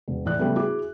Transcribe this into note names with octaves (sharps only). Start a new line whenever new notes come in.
E1
A2 E3 D5 F#6
C#3 G3 A3 B3
E4 F#4 G#4 D6